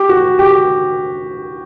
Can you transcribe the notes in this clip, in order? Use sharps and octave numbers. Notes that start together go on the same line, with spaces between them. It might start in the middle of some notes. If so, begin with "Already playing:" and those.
Already playing: G4
F#4
G4